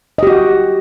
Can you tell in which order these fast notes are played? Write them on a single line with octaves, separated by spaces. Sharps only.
D#5 G4 F#4